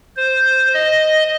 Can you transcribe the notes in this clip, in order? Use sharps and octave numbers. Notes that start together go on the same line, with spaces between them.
C5
D#5